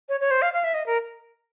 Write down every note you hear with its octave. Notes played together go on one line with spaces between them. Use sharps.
C#5
C#5
C5
F5
F5
E5
D#5
A#4